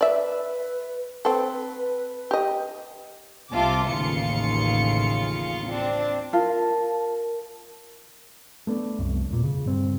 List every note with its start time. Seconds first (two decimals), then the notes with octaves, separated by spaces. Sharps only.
0.01 B4 D5 E5
1.25 C4 A4 B4
2.31 G4 D#5
3.51 C2 C3 F4 A5 D6
3.87 A1 D#2 C#3 F4 C#7
5.67 C4 D4
6.33 F4 A#4 A5
8.67 A3 B3 D4
8.99 C2 F#2
9.29 E1 A#2
9.44 C#3
9.66 G2 C4